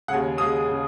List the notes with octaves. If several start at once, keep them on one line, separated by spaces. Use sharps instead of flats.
D#2 C#3 G#3 F#5
D#2 C#3 G#3 D#6
C#3 G#3